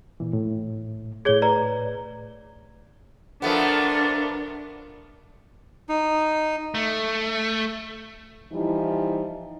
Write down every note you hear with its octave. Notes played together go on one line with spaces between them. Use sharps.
A#2 E3
A2
A2 G#4 C#5 G#6 G7
B4 D5 A#5
F3 A3 B3 D4 A#4
D#4
A3
E3 F3 G3 D#4 E4